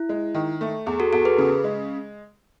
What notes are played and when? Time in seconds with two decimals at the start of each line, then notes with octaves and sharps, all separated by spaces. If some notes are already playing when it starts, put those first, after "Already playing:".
Already playing: E4
0.09 G#3
0.35 D#3
0.61 A3
0.86 E2 G#4
1.00 F#4 A4
1.13 E2 F#4 A4
1.25 G#4 B4
1.38 C#3
1.64 G#3